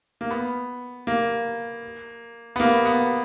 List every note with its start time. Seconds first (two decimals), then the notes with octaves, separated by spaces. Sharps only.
0.21 A#3
0.30 B3
1.07 A#3
2.56 B3
2.60 A#3
2.85 B3